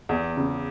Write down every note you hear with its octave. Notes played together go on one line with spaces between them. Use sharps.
E2
C#3